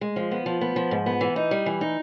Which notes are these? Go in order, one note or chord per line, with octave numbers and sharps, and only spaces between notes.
G#3
F3
B3
F3
B3
F3
G#2
B3
E3
D#4
G3
E3
D#4